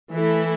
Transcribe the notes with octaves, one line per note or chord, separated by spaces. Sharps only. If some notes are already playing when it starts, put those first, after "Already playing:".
E3 A3 E4 A4